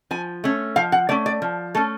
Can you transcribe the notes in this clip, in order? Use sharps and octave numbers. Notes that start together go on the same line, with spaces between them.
F3 G#5
A3 C#4
F3 F5
F#5
A3 C#4 D5
D5
F3
A3 C#4 A4